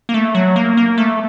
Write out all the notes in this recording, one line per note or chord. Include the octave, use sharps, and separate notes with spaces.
A#3
A3
F#3
A#3
A#3
A3